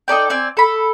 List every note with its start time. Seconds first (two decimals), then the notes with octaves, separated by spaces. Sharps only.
0.08 D#4 A4 D5 G5
0.30 C4 D5 G#5
0.57 A4 B5